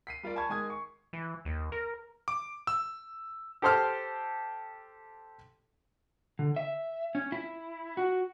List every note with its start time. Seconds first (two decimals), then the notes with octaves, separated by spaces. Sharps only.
0.07 B6 C7 D#7
0.23 G3 F4 A#4 D5
0.36 G#5 A5 B5 C#6 G#6
0.49 D#3 G#3 G#5 D#6 G#6
0.70 C#6
1.13 E3
1.45 D#2
1.72 A#4
2.28 D6
2.67 E6
3.62 G4 A4 C5 C6 D6 F6
6.39 D3
6.56 E5
7.15 C#4
7.32 E4
7.97 F#4